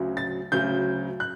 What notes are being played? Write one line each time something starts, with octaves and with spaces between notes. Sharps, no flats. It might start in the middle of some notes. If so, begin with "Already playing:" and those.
Already playing: D2 C#3 F#3
A6
D2 C#3 F#3 G6
F#6